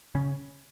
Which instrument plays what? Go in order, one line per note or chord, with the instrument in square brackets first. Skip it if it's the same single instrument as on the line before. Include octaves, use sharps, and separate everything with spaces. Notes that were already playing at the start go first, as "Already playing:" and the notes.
[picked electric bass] C#3 C#4